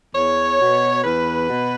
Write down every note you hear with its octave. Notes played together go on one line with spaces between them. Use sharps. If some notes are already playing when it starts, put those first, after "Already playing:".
E2 C#5
B2
E2 B4
B2